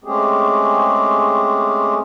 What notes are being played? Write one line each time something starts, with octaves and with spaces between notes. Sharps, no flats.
G#3 A3 C4 C#4 G4 G#4